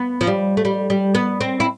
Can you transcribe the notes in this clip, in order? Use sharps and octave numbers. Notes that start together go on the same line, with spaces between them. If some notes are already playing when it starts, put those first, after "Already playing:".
Already playing: B3
F3
G3
A3
G3
G3
B3
C4
E4